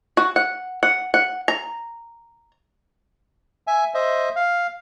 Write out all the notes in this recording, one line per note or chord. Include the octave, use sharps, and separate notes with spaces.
F#4
F#5
F#5
F#5
A#5
E5 G#5
C5 D#5 E5
F5